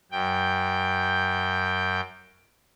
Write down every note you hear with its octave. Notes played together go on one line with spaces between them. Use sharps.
F#2 G5